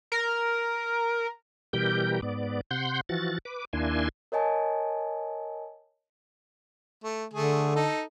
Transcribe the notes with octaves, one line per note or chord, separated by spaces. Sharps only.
A#4
B2 E3 G3 G4 A#4 G6
G#2 B3 D5
C3 F#5 C6 G6
E3 F3 F#4 A6
B4 D6
D#2 A#3 D4 E4 G#5 C6
A#4 C#5 D#5 G#5 A5
A3
D3 A3 G#4
D#4 A4